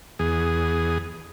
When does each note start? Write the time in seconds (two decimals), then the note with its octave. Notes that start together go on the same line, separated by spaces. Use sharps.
0.19 E2 G#4